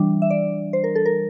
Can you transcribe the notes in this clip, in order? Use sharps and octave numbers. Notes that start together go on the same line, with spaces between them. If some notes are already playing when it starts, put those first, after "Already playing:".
Already playing: E3 G3 D4
E5
D5
C5
A#4
A4
A#4